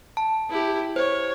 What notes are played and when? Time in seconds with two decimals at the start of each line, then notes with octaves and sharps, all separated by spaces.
0.17 A5
0.49 E4 G4
0.96 C5 C#5